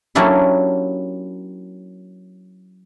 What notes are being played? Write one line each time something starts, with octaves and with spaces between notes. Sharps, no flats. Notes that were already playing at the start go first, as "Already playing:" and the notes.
F#3 A#3 C#4 D4 E4 G4